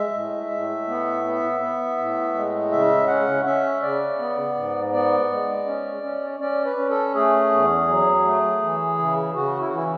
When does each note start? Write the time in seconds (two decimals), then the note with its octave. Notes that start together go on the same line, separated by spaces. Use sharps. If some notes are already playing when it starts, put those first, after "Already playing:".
Already playing: G#3 E5
0.13 A2
0.51 A2
0.88 B3
1.24 B3
1.61 B3
1.97 A2
2.35 G#3
2.72 C#3 E5
3.08 C#4 F#5
3.45 C#4 E5
3.82 C#3 D5
4.19 B3
4.55 G#2
4.92 B3 D5
5.30 G#3
5.66 C#4
6.04 C#4
6.40 C#4 D5
6.65 B4
6.77 C#4
6.90 A4
7.15 A3 G#4
7.50 E2
7.88 F#3
8.25 A3
8.61 E3
8.98 C#3
9.35 C#3 F#4
9.60 E4
9.68 F#4
9.73 E3 E4